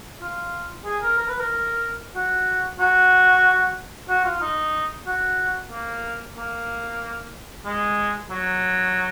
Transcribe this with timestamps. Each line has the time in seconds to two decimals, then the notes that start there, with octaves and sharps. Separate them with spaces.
0.21 F4
0.85 G#4
1.02 A#4
1.19 A#4
1.29 B4
1.39 A#4
2.16 F#4
2.79 F#4
4.09 F#4
4.25 F4
4.41 D#4
5.07 F#4
5.71 A#3
6.36 A#3
7.65 G#3
8.30 F#3